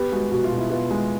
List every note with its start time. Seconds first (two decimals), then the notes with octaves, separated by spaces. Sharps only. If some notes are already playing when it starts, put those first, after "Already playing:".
Already playing: B3 G4
0.12 G#3 F#4
0.31 B2 F#4
0.44 F4
0.52 B2
0.58 E4
0.70 B3 F4
0.91 G#3